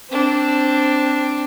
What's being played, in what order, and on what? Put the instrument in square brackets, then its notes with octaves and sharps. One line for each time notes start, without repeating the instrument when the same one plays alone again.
[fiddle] C4 D4